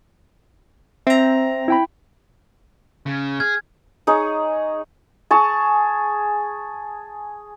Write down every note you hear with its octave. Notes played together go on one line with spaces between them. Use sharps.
C4 E5 A#5
E4 G5 B5
C#3
G#4 F6 G#6
D#4 G#4 C#5
G#4 A5 C#6